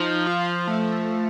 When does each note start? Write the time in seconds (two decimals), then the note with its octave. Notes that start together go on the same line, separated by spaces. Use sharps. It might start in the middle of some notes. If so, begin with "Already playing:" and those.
Already playing: F3 D#4
0.27 F4
0.67 A3